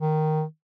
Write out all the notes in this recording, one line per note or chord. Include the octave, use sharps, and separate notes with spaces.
D#3